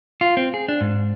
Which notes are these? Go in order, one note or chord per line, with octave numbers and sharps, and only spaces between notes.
F4
C4
G#4
D4
G#2